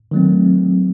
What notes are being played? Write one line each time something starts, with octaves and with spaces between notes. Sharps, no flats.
D#3 F#3 A3 C4